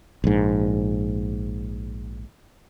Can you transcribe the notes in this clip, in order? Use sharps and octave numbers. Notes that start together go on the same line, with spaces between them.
A#1 G#2